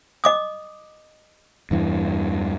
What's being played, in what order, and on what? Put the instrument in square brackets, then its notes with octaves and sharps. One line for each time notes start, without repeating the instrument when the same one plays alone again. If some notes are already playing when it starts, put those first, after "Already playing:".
[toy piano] D#5 D6 D#6
[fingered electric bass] E2 G2 E3